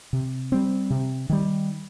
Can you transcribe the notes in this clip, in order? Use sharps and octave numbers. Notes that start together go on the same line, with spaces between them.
C3
G3 C4
C3
D#3 G3